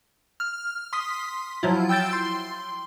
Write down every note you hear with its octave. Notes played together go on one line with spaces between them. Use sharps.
F6
C6 D#6 B6
F3 F#3 E4 F4
G5 E6 G6 A6 D7
C6